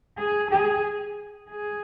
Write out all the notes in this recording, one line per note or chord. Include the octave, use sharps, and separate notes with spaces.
G#4
G#4
G#4